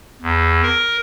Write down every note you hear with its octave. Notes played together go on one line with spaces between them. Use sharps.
E2
A#4